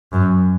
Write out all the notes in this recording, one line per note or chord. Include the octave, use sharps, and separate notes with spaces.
F#2